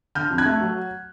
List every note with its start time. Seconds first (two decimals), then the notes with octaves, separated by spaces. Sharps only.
0.15 D3 F6 G6
0.30 F2
0.38 F#6 G#6
0.46 A3
0.61 F#3